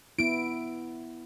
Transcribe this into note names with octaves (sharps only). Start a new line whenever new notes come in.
B3 E4 D7